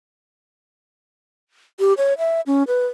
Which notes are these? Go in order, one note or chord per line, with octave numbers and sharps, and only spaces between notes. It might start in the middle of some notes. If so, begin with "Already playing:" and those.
G4
C#5
E5
C#4
B4